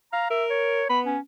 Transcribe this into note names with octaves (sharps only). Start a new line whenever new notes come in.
F5 A#5
A#4 E5
C#5
B3 B5
C#4